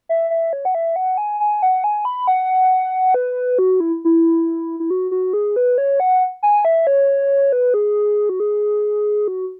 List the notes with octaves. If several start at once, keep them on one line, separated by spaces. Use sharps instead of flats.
E5
E5
C#5
F#5
E5
F#5
G#5
G#5
F#5
G#5
B5
F#5
B4
F#4
E4
E4
E4
F#4
F#4
G#4
B4
C#5
F#5
G#5
E5
C#5
B4
G#4
F#4
G#4
F#4